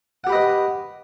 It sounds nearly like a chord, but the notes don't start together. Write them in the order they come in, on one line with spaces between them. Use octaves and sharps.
F#5 G4 B5 D#5 B4